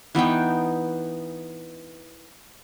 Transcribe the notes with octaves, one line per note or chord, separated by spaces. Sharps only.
E3 B3 D#4 G5